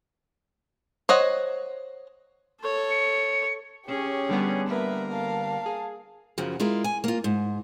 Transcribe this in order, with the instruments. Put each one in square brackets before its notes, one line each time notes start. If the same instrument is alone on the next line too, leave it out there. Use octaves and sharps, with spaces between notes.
[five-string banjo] C5 C#5 D#5 F#5
[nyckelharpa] A4 C#5
[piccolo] C#7
[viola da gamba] C#4 G#4 [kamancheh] G4 C#5
[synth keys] D3 G3 B3
[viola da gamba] A#3 A#4 [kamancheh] B4 E5
[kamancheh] F5 A5
[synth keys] G#4
[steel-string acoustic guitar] F#2 C#3 F3 F#3
G#3 E4 F4 A#4
G#5
A#3 F4
G#2